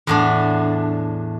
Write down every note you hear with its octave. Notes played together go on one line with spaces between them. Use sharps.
E2 A2 D4